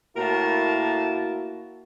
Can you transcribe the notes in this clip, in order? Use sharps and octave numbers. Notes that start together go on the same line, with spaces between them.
A2 A#3 E4 F#4 A#4 A5